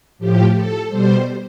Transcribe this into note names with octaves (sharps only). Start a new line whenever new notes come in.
A2 F3 G4
A4
B2 G3 C5